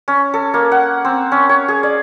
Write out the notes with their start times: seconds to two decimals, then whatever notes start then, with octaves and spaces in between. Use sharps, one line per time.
0.08 C#4
0.34 A4
0.54 A#3
0.72 F#5
1.05 C4
1.32 C#4
1.49 C#5
1.68 G#4
1.83 D5